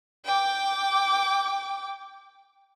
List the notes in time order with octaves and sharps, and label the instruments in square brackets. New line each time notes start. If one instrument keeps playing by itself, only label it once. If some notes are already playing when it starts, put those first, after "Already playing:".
[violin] G5 D6